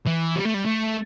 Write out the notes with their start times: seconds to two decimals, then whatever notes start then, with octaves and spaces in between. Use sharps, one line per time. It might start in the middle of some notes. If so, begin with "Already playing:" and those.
0.07 E3
0.36 G3
0.45 A3
0.54 G3
0.65 A3